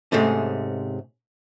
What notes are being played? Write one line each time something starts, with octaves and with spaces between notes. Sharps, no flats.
G#2 C3 G#3 A3 C#4